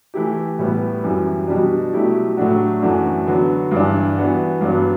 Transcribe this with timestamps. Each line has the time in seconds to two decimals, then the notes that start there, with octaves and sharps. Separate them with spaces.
0.14 E3 A3 E4 G4
0.59 A2 G3 B3
1.03 F#2 E3 G3
1.48 B2 G3 D4
1.93 B2 F#3 A3 E4 G4
2.37 A2 F#3 A3 D4 F#4
2.82 F#2 E3 A3 D4 F#4
3.27 D3 F#3 B3 F#4
3.71 G2 E3 G3 D4
4.17 E3 B3 F#4
4.61 G2 F#3 B3 D4